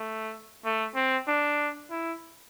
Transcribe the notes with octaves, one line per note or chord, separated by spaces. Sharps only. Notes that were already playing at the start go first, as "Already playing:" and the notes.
Already playing: A3
A3
C4
D4
E4